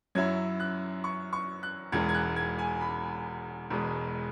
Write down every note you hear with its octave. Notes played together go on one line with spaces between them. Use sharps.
F#2 F#3 C#4 E4 G#6
F#6
C#6
C#6
F#6
E1 E2 E3 G#3 G#6
G#6
F#6
G#6
G#5
B5
E1 E2 B2 G#3